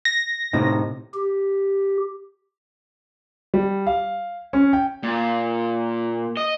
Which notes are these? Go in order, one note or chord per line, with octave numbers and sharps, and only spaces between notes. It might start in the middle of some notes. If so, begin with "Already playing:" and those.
A#6
A2 C3 D#4
G4
G3
F5
C#4
G5
A#2
D#5